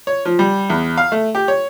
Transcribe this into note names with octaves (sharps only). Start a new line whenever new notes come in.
C#5
F3
G3
E2
F5
A3
G4
C#5